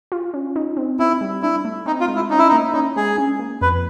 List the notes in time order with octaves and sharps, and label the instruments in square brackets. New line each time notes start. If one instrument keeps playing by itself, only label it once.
[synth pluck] F4
C#4
D#4
C4
[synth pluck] C4 [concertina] E4
[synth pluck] G3
[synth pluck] D4 [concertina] E4
[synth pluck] A3
[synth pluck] C4 [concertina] D#4
[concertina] F4
[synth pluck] G#3
[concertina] E4
[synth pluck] C#4 [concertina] D#4
[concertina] E4
D#4
[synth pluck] A#3
[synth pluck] C#4 [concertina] D#4
[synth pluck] G#3 [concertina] G#4
[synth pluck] C#4
A#3
[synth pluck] F2 [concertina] B4